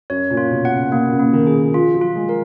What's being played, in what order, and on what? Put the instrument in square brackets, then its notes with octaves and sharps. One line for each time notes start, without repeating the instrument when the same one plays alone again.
[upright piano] F#2 [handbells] C#5
[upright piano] A#2
[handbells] F4
[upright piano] B2
[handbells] F#5
[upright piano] C#3
[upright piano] B2 [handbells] A#3
[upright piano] C#3
[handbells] A#3
[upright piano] D#3
[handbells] G#4
[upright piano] D#3
[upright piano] F3 [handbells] F4
[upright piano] F#3
[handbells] F4
[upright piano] G#3
[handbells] A#4